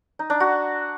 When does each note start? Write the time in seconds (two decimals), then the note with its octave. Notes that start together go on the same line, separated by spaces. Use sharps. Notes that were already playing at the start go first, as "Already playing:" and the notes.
0.19 D#4
0.30 D4
0.40 F#4